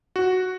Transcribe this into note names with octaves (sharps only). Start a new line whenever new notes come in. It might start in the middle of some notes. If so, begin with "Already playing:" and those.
F#4